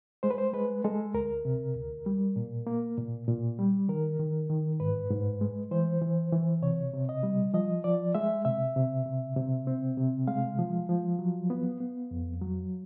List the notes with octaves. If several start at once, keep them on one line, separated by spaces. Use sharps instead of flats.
G#3 C5
B4
C5
G#3 B4
G#3 A4
D2 A#4
C3
D2
G3
A#2
A#3
A#2
A#2
G3
D#3 A#4
D#3
D#3
G#2 B4
G#2
G#3
E3 C5
E3
E3
C3 C#5
C3
D#5
G3
F3 D#5
F3 D5
G#3 E5
C3 E5
C3
C3
C3
C4
C3
G#3 F5
F3
F3
F#3
B3
B3
F2
F#3